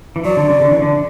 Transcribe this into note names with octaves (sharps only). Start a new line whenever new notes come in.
E3
F#3 D5
D3
C#3
D3
E3
D3